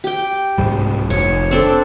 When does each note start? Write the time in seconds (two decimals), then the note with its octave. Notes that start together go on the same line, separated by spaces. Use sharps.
0.04 G4 G5
0.58 C2 G#2 G3
1.10 F1 C#5
1.51 C4 D4 A4